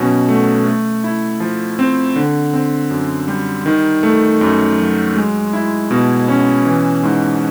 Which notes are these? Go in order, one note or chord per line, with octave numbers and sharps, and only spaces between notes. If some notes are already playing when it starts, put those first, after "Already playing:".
Already playing: B2 F#3 C#4
A3
A3
E4
F3
C4
D3
C4
F#2
G3
D#3
A3
F#2
F#3
G#3
E4
B2
C#4
E3
G#2